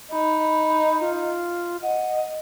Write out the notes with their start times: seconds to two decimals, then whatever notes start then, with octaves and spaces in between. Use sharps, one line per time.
0.12 D#4 B5
1.01 F4
1.83 D#5 F#5